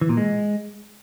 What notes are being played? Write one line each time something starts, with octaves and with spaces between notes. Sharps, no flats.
E3
A#2
G#3